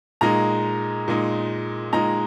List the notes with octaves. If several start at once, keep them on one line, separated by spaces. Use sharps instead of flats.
A#2 G#3 D#4 A#5
A#2 G#3 D#4
A#2 G#3 D#4 A#5